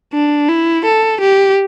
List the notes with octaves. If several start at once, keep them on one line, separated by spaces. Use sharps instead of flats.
D4
E4
A4
G4